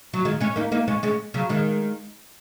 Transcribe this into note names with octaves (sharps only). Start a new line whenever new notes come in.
F#3
D#3 G#3
G#3 C#4
A#3 D#4
A#3 D#4
G#3 C#4
G#3 C#4
C#3 F#3
D#3 G#3